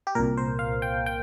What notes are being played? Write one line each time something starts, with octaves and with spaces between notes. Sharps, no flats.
G4
C2 A#2 A#4
C5
F5
G5
G5